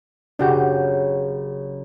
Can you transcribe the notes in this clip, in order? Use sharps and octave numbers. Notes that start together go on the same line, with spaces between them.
F#1 C#3 D4 F#4 G4 G6